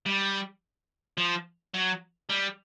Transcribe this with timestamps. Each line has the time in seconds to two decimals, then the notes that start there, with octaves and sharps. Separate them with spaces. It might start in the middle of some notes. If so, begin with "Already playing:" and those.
0.06 G3
1.18 F3
1.74 F#3
2.29 G3